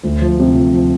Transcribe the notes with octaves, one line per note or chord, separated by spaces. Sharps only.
D2
F3
C3
F3
F3